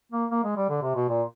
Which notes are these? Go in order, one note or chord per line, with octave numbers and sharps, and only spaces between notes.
A#3
A#3
G#3
G3
D3
C3
B2
A#2